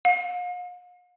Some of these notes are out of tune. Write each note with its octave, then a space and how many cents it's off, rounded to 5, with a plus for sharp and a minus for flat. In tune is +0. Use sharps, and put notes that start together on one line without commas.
F5 +45